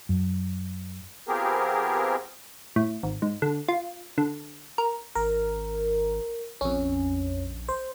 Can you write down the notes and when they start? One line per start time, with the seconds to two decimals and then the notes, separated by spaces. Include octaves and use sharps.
0.09 F#2
1.28 F3 B3 C4 G4 G#4 A#4
2.76 A2
3.03 G#1
3.22 G#2
3.42 D3
3.68 F4
4.18 D3
4.78 A#4
5.15 G#1 A#4
6.61 A#1 F2 C#4
7.69 C5